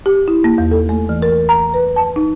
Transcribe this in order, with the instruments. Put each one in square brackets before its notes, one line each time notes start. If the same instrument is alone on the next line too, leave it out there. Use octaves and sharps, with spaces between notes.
[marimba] G4
E4
A#3
E2
A4
A3
E3
A#4
A#5
B4
A5
D#4